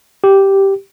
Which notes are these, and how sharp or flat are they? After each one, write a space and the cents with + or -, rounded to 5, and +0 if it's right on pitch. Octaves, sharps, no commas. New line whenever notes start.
G4 -5